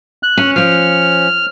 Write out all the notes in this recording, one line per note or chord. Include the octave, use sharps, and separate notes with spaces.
F#6
C#4
F3 C#4 F6